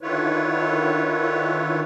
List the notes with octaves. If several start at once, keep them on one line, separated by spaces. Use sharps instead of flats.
D3 D#3 E4 F4 B4 C#5